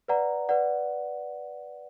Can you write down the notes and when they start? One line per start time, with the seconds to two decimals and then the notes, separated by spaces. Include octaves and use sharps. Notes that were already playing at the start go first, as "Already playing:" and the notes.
0.08 B4 D5 F#5 A#5
0.49 B4 D5 F#5